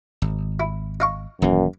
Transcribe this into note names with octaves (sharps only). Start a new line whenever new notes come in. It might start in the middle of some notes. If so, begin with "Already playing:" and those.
G#1
E4
D#4 F5 C#6
D#1 F#2 E3 A#3